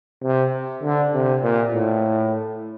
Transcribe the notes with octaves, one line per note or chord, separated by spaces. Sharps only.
C3
D3
C3
A#2
A2